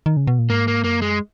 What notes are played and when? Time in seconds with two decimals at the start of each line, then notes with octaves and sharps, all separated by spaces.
0.06 D#3
0.17 C#3
0.27 B2
0.39 A#2
0.50 G#2 A#3
0.68 A#3
0.84 F#2 A#3
1.02 G#3